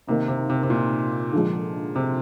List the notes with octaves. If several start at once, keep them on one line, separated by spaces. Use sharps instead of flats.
C3 D#3 A#3 D#4
C3
C3
C3
A#2
D3 F3 G#3
C3